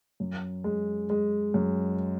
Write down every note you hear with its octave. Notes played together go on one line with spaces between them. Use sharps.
F#2
G#3
G#3
F#2